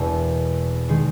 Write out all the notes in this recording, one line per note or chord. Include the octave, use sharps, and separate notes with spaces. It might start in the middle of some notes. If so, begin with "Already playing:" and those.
Already playing: E1 E2 B2 A#3 E4
D#3 G#3